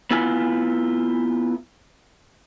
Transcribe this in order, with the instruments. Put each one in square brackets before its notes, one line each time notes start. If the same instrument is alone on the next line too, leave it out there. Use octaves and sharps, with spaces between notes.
[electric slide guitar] B3 E4 F4 G#5